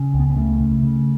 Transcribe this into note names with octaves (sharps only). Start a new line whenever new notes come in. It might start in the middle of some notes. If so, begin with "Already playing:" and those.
Already playing: C#3
C#2
B3
B3
C#3 A3
C#3
C#3